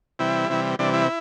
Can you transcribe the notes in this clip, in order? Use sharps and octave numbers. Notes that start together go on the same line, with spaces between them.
C3 E3 G3 E4
C3 E3 G3
C3 E3 G3 D4
E4